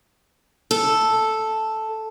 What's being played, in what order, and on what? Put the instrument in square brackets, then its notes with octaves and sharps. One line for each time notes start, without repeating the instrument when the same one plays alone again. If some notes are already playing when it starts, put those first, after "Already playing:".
[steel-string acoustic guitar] A4